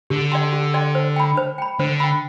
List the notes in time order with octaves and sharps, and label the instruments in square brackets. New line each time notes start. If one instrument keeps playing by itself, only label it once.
[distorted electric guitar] D3 [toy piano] G4
[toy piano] D5 G5 C6
G4
D5 G5 C6
C5
G5 B5
C5
G5 B5
[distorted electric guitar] D3 [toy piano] C5
[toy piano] G5 B5